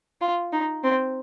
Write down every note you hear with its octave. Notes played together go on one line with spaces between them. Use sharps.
F4
D#4
C4